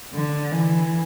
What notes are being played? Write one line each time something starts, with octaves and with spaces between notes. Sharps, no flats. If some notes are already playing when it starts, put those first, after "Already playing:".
D3
E3